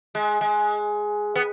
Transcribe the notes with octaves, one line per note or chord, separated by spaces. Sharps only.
G#3
G#3
B3